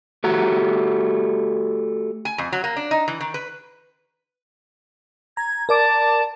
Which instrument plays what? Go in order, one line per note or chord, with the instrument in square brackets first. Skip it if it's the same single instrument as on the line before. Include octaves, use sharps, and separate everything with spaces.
[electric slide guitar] A3 F#4 G4 A#5
[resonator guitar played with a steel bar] G#5
F2
F#3
A#3
D4
D#4
E3
D#3
B4
[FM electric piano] A#5 [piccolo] G#6
[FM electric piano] A#4 D5 D6 [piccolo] A5